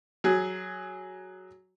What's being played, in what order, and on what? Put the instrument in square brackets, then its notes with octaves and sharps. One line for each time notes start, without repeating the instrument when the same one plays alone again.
[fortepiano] F#3 G#4